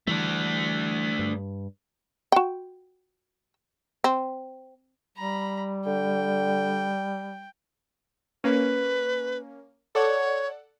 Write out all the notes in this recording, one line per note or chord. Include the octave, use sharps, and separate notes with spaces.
E3 G3 A3 D4
G2
F#4 G5
C4
G3 A#5 B5
D3 G5
A#3 C#4 B4
A4 C#5 D5 F#5